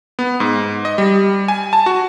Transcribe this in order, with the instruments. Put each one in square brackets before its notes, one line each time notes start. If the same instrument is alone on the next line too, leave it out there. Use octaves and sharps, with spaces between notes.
[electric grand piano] B3
G#2
D#5
G3
G#5
A5
F#4